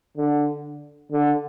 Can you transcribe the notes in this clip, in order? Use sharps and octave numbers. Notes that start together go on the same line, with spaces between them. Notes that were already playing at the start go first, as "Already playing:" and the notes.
D3
D3